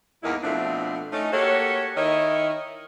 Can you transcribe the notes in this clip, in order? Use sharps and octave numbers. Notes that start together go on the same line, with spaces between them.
E2 G#2 A#3 D#4 E4 A#4
B2 F3 A3 C4 D4 E4
A3 C#4 D#4
A#3 F#4 G4 A4 C#5
D#3 E4 A#4 C#5 D#5 E5